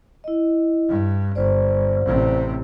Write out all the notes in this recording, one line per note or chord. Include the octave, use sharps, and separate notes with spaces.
E4 D#5
G2
G1 C5 D5
A1 C3